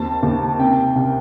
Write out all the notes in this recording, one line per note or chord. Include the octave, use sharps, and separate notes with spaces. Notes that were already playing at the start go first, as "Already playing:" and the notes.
Already playing: D#2 C4 A5
D#2
C3 G5
C2